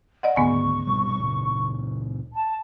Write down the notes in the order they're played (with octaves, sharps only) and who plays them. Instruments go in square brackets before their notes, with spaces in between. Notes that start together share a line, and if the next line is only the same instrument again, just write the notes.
[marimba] D5 D#5 F#5
[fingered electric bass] C#2 D3 D#3 [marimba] G#2 B3 G#5 [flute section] C#6
[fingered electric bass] A#1 B2 G3
C#2 A#2 C#3
[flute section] A5